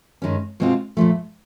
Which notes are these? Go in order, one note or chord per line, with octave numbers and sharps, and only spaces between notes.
G2 D#3 G#3 C#4
B2 G#3 C4 F4
A#2 F3 A3